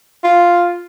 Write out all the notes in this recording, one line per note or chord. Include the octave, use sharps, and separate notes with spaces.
F4